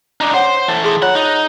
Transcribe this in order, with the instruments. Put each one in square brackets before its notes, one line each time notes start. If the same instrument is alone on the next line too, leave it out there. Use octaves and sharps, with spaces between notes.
[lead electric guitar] D4 D#4
[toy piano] C#4 C#5 F#5 [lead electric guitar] C5
[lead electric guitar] E3 A4
[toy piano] G#4 C6 D#6
[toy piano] F4 C#5 A#5 [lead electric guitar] F#5
[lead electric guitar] D#4